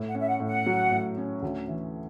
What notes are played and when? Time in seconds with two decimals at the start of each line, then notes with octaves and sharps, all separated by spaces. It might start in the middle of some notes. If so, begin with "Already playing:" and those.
Already playing: A2
0.08 F#5
0.15 C#4
0.20 E5
0.28 F#5
0.40 A2
0.47 F#5
0.66 F#3
0.91 A2
1.18 C#4
1.42 D2
1.68 E3